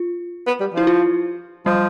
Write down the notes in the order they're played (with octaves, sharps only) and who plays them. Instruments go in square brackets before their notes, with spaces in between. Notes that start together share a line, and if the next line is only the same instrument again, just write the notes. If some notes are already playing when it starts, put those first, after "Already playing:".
Already playing: [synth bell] F4
[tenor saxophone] B3
G3
[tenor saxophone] F3 [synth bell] E4
[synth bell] F4
[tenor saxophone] F3 [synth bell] G3